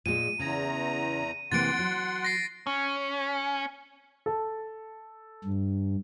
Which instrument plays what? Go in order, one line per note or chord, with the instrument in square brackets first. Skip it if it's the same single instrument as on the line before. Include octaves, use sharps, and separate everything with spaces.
[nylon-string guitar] A#2 G#3 [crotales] D#7
[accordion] E2 A#5 [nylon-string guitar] C#3
[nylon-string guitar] C3 E3 A#3 [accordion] F#5 C6 [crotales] A6 D7
[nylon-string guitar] F#3
[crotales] A#6 C7
[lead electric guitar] C#4
[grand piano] A4
[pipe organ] G2